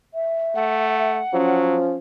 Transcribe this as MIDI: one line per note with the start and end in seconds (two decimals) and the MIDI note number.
0.14 1.13 76
0.55 1.21 57
0.55 1.61 78
1.33 1.97 53
1.33 1.79 54
1.33 1.97 61